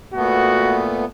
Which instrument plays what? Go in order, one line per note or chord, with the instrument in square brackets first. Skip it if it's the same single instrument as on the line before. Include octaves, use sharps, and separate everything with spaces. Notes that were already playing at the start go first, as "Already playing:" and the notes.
[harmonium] A#2 A3 B3 [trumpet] F#4